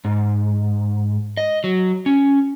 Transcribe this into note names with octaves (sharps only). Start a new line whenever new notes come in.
G#2
D#5
F#3
C#4